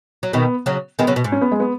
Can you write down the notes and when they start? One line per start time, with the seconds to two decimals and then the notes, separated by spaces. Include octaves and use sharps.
0.23 F#3
0.33 B2 D#3 B3
0.66 C#3 F#3
0.99 D#3 G#3 B3
1.07 C#3 F#3
1.16 B2
1.24 G#2
1.32 C#4
1.41 B3
1.52 G#3
1.60 B3